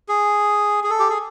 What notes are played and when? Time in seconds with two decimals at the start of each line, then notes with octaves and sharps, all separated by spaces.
0.09 G#4
0.84 G#4
0.90 A4
1.00 G4
1.10 G#4